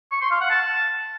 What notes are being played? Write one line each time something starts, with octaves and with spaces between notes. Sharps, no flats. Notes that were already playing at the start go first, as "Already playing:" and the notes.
C#6
C6
F5
F#5
A5